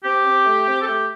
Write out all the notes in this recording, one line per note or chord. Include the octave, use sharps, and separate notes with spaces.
C4 G4
C4
A3
C4
A4
A3 G4